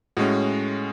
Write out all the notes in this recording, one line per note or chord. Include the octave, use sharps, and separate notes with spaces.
A2 G#3 C#4 F#4